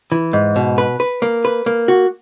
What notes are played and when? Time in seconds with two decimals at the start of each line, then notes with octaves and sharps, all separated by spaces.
0.12 E3
0.33 G#2
0.56 B2
0.78 B4
1.00 B4
1.22 A#3
1.45 B4
1.66 A#3
1.88 F#4